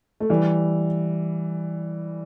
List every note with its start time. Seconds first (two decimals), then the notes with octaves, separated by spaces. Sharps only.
0.20 A3
0.29 E3 G3